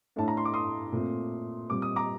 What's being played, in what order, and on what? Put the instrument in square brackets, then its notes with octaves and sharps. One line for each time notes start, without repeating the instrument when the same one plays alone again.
[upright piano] A2 A3 D4 A5
A#5
C6
D6
C6 D#6
A#2 A3 C4
A#2 G3 C4 D6
D#6
A#5 D6